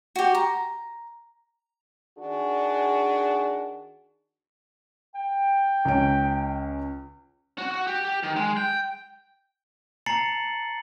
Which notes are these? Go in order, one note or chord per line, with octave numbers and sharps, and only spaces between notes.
F#4 G4
A#5
D#3 D4 F#4 G#4
G5
C#2 C#4 D7
F#4
F#4
G4
G4
D#3
G#3
G5
A5 A#5 A6 C7 C#7 F#7